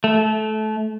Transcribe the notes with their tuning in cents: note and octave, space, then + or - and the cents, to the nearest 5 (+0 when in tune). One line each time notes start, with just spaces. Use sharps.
A3 -20